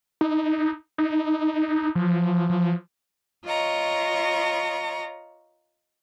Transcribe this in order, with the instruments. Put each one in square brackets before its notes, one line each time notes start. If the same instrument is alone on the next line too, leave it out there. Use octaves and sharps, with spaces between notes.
[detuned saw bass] D#4
D#4
F3
F3
[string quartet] F4 C#5 D#5 A#5 C#6